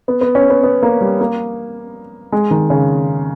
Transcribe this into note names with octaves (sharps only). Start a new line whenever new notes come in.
B3
B3
C#4
B3
B3
A#3
G3
A#3
G#3
D#3
C#3